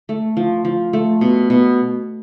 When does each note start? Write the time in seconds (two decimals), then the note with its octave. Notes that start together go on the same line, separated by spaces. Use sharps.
0.09 A3
0.37 F3
0.65 F3
0.93 A3
1.21 B2
1.50 B2